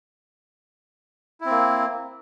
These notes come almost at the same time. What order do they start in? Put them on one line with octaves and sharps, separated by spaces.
E4 C4 A#3